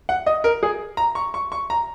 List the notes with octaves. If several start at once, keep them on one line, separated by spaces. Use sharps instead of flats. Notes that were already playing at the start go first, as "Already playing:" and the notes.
F#5
D#5
A#4
G#4
A#5
C#6
C#6
C#6
A#5